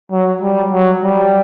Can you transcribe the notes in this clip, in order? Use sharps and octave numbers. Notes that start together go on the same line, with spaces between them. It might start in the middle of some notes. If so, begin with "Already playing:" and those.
F#3
G3
F#3
G3